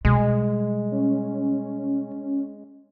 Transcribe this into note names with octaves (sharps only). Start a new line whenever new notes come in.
B2 G3 G#3
C#4